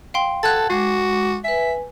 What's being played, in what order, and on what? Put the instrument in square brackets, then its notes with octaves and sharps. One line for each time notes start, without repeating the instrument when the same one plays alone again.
[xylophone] F5 G5 C6
[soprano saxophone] A4 [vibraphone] F#5 A5 [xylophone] F#6 G#6 A6
[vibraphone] G#3 D6 [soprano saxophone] F#4
[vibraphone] B4 G#5 [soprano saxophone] E5